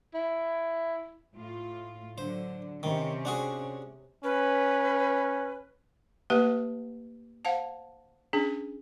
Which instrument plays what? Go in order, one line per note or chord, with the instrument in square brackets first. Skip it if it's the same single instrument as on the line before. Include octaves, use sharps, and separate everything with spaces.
[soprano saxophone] E4
[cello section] A2 F4
[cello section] D3 F#3 [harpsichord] C5
[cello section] C3 C#4 [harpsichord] D#3
[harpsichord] D4 F#4 G#4
[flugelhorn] C#4 [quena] B4
[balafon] A3 A#3 G4 B4 F#5 A5
C5 F5 F#5 A5
C#4 D4 G#4